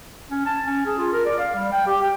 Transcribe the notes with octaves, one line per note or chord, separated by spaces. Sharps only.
C#4
A5
C#4
G#4
F4
A#4
D5
F5
G3
G5
G4
G5